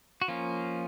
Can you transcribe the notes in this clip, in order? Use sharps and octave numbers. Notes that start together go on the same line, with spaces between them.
F#4
F3 A#3 C#4 F4